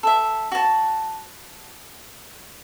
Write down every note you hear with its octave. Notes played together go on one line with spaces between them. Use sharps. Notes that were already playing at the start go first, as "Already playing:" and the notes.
A4 E5
F#4 A5